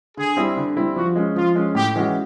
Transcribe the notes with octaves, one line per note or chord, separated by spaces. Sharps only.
D3 G#4
G3 C4 E4
D3
G3 C4 E4
F3 F#4
G#3 C#4
F3 F4
G#3 C#4
A2 G4
E3 G#3 C#4 F#4